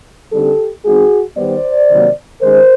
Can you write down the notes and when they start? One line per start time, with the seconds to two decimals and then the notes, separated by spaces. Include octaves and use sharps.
0.33 D3 G3 C4 D#4 G4 A4
0.84 E3 G#3 C4 D#4 F#4 G#4
1.36 D#3 G3 B3 C5 D5
1.89 C3 D#3 F#3 A#3
2.40 D#3 G#3 C#4 A#4 C5